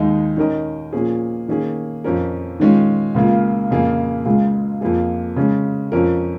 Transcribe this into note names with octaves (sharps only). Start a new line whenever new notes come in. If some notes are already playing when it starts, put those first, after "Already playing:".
Already playing: D#2 D#3 G#3 D#4
D#3 C#4 A#4 D#5
A#2 F3 A#3 C#4 G#4
D#3 A#3 C#4 G#4
F2 F3 C#4 A#4
D#3 G#3 C#4 F4
C#2 C#3 A#3 F4
F2 C#3 A#3 F4 G#4
C#2 C#3 G#3 F4 G#4
F2 F3 A#3 F4 G#4
C#3 G#3 C#4
F2 F3 C#4 A#4